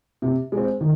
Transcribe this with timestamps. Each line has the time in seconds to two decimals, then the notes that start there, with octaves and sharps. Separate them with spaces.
0.22 C3
0.52 G#3 C4
0.81 D#3